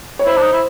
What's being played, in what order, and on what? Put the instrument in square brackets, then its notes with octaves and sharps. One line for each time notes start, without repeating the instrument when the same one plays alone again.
[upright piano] C#5
[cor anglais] E4 [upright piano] C5
[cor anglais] D4
D#4
E4